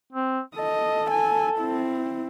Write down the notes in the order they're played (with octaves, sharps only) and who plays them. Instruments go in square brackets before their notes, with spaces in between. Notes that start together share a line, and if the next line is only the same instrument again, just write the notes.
[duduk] C4
[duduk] A4 [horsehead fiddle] D#5
[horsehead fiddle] G#5
C4 E4